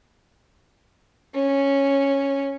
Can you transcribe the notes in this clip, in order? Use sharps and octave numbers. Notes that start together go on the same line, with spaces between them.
C#4